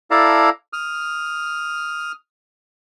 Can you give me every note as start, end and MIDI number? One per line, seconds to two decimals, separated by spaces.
0.11 0.50 64
0.11 0.50 69
0.11 0.50 74
0.11 0.50 77
0.11 0.50 81
0.11 0.50 82
0.73 2.12 87
0.73 2.12 89